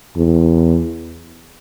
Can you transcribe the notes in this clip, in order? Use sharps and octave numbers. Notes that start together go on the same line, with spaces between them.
E2